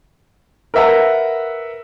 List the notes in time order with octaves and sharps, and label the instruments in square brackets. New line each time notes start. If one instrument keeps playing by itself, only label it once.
[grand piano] A#4 B4 E5 F#5 A#5